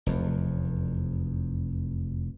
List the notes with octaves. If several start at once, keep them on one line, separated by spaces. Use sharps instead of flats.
F1 E2